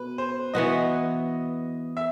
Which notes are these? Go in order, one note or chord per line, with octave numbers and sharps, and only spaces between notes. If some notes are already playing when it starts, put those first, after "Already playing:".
Already playing: B2 B4
C5
E3 B3 F#4 D#5
E5